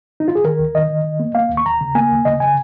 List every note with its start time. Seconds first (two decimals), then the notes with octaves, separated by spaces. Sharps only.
0.20 D#4
0.28 F4
0.35 G#4
0.44 D#3 A#4
0.59 D#2
0.74 D#3 D#5
0.90 D#3
1.04 D#3
1.20 A#3
1.35 A#3 F5
1.50 D#2
1.57 C#6
1.66 D#2 A#5
1.81 C#3
1.95 A#3 G#5
2.11 D#2
2.25 C#3 D#5
2.40 C#3 G#5